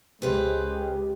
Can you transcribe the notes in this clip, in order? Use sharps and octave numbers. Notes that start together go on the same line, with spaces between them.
C#2 G#3 G4 B4 C5 F5